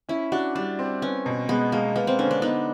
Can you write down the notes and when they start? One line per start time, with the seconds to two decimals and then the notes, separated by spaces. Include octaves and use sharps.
0.09 C#4 E4
0.32 D4 F#4
0.55 G3 D4
0.79 C4
1.02 B3 C#4
1.26 B2
1.49 G#3 B3
1.72 G#3 A#3
1.96 A#3 B3
2.07 C4
2.19 D3 C#4
2.31 D4
2.42 B3 D#4